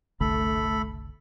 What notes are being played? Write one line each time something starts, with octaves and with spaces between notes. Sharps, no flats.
F#1 C2 D3 A3 A4 B5